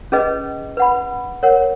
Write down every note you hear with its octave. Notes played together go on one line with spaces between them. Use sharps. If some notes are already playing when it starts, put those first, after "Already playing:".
C#4 G#4 B4 D#5
B4 F#5 B5
A#4 C#5 F#5